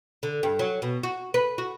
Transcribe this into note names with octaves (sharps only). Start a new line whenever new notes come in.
D3
G2
F#3
B2
F#4
B4
F#4